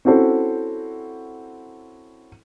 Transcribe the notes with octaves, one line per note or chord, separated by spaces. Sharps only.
C4 C#4 E4 F#4 A4 C5